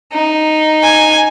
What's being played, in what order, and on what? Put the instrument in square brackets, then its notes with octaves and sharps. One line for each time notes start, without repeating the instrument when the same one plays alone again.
[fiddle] D#4
[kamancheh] G#5